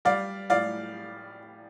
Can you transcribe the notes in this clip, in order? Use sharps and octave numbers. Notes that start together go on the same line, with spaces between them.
G3 D5 F5
A2 D5 F5